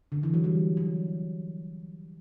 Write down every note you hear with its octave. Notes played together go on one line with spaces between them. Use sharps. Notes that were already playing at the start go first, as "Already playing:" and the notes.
D3
E3
F#3
G3
F#3